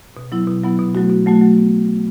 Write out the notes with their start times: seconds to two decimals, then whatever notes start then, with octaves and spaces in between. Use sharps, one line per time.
0.17 B2
0.32 F#3 B3 E4
0.48 B2
0.63 F#3 B3 E4
0.79 B2
0.95 F#3 A3 F#4
1.10 B2
1.26 F#3 A3 F#4
1.41 F#3
1.57 B3